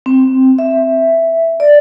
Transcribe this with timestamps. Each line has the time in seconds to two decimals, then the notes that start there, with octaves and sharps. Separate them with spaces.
0.06 C4
0.59 E5
1.60 D5